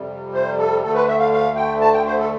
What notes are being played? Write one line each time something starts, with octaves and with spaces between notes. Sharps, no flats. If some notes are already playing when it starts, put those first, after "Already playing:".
Already playing: F2 C3 G3
C5
A4
D2 D3 A3 A4
B4
E5
F5
F5
G5
A5
G5
C5
A4